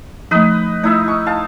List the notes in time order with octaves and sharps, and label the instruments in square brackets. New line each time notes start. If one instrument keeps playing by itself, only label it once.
[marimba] F3 A3 [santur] D#4 B4 D#5
[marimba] A3 [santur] D#4 E4 E5
[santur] C#6
F5 A5